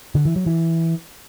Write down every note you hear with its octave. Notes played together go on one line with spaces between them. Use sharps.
D3
E3
F#3
E3